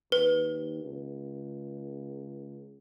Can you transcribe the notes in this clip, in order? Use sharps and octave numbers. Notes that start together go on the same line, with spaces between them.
D#2 B4
C#2